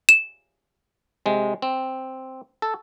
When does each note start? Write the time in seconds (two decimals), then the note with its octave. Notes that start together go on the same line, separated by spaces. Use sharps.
0.09 E7
1.26 C3 G#3
1.62 C4
2.62 A4